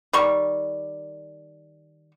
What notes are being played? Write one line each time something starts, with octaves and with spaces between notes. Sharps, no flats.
D#3 G3 C#6